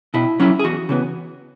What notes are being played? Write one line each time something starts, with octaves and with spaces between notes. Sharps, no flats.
B2 E4
F#3 C#4 E4
G#4
E2 F#4
C#3 E3 B3